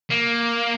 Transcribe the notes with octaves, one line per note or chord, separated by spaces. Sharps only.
A#3